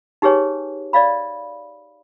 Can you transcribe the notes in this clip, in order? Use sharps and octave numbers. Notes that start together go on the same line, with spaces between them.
D#4 G4 G#4 B4 C#5 G#5
D5 D#5 F5 B5